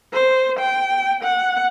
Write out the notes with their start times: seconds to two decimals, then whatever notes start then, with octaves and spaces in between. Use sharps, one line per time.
0.13 C5
0.59 G5
1.23 F#5